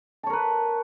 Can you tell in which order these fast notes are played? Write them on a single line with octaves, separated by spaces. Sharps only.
A5 C#5 A#4 B4